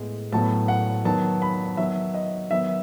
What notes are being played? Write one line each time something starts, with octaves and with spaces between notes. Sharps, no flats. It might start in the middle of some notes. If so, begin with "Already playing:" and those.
Already playing: A2 G#3 B3
A2 F#3 B3 A5
F#5
D#3 F#3 B3 A5
B5
D#3 F#3 B3 E5
D#5
D#3 F#3 B3 E5